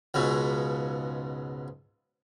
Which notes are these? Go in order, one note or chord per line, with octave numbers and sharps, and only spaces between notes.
C#2 G#2 B2